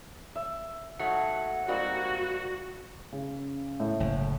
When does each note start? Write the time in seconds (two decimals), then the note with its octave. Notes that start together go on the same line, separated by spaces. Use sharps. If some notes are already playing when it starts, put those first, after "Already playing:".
0.36 E5
0.99 G#2 F#3 A3 F#5
1.68 G#2 G3 A#3 C4 F#4
3.12 C#3
3.80 A2
4.00 F#1